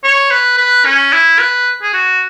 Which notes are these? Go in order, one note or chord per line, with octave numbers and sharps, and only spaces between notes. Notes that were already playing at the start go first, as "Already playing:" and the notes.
C#5
B4
B4
C#4
E4
B4
G#4
F#4